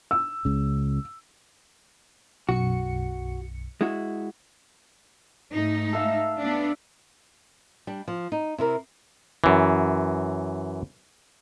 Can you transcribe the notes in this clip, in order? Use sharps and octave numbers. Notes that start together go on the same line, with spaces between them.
E6
C#2 C#3
B1 F#2 F#4 C#7
G#3 E4 F#4
G#2 A3 D#4
A4 E5 F5
B3 D4
G3 D4
F3
D#4
C3 E4 A#4
F#2 E3